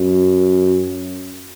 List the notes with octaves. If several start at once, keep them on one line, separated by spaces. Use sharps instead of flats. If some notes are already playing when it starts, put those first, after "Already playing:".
Already playing: F#2